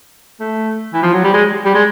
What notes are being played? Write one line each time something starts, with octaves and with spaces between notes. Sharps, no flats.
A3
E3
F3
F#3
G3
G#3
G3
G#3